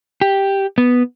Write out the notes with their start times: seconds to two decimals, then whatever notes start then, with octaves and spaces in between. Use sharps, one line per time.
0.21 G4
0.78 B3